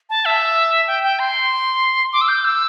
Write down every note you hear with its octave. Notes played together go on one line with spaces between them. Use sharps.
A5
E5
G5
G5
C6
D6
E6
G6
E6